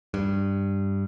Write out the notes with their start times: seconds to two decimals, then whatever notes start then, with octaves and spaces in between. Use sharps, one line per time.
0.14 G2